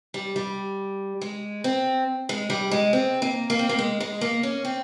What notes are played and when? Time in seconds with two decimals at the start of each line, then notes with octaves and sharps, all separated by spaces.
0.14 G3
0.36 G3
1.21 G#3
1.64 C4
2.29 G#3
2.50 G3
2.71 G#3
2.93 C4
3.22 A#3
3.50 A#3
3.59 C4
3.69 A#3
3.79 G#3
4.00 G#3
4.21 A#3
4.43 C#4
4.65 C4